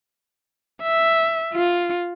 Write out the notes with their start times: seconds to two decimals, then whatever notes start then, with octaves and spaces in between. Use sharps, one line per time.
0.83 E5
1.54 F4